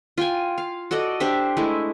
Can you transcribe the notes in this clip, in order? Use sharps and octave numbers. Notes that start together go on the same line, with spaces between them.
F4 G5 G#5
F5
F#4 A4 D5 D#5
D4 G4 C5 E5
G#3 A3 E4